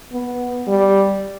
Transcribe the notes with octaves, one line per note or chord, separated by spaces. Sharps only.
B3
G3